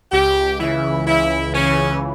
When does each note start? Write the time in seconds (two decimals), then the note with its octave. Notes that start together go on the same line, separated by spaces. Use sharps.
0.12 C#2 G4
0.60 C#3 E3 E4
1.07 C#2 E4
1.54 C#3 E3 C#4